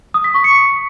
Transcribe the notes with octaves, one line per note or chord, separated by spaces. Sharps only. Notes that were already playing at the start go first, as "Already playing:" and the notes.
D#6
B6
C#6
C#7